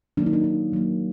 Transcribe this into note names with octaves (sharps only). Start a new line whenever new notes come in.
D#3 F#3 A#3 D4
D#4
D4
D4
D#3 F#3 A#3